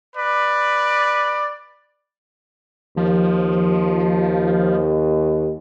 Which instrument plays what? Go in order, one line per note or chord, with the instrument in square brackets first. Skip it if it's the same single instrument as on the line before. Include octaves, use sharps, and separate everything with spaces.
[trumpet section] B4 D5
[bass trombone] D#2 [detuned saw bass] F3